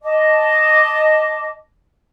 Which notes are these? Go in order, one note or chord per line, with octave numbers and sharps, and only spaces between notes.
D#5 A5 D6